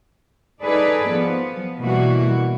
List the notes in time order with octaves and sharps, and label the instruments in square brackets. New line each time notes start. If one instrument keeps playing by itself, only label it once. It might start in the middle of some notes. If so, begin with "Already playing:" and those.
[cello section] D#4 G#4 A4 B4 D5
F3 B3
B2 E3 G3 A#3 E4 F#4